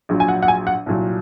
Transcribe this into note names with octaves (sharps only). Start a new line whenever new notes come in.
A#1 A#2 F#3
G#5
F#5
F#5
G#5
F#5
C2 A#2 F#3